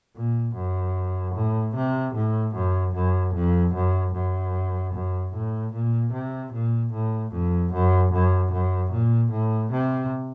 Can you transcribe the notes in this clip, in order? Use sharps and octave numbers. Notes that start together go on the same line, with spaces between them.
A#2
F#2
A2
C3
A2
F#2
F#2
F2
F#2
F#2
F#2
A2
A#2
C3
A#2
A2
F2
F#2
F#2
F#2
A#2
A2
C3